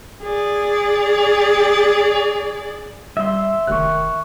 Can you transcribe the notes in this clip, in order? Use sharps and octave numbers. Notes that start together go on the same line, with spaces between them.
G#4 D5
G3 E5 C6
F1 D#3 C#6 F#6